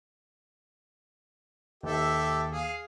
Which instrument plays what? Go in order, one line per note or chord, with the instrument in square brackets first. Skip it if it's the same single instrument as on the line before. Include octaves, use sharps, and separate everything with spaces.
[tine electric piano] D#2 [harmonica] G4 A4 E5
[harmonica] G#4 F5